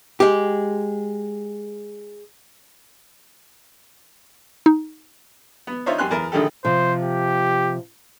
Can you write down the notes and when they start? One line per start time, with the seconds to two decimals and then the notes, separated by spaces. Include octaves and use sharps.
0.20 G#3 G4
4.66 D#4
5.67 B3
5.86 D4 D#4 F4 C5 C#5 E5
5.98 F#2 G4 G#5 C6 F#6
6.11 E2 A#4
6.32 A#1 D3 D#3 G#3 G4 A4
6.65 C3 F3 C5
7.03 G4